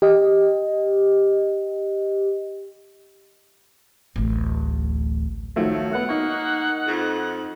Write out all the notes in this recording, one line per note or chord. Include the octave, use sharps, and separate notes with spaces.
G4 D#5
D1 A1
D#3 F3 F#3 A3
A3 B3 F#5
A#3 D#4 C#6
F2